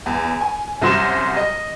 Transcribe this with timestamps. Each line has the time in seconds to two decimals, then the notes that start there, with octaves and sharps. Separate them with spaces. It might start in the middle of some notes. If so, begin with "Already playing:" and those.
0.06 E2
0.41 G#5
0.81 C2 F#2 F#3 C5 C6 E7
1.36 D#5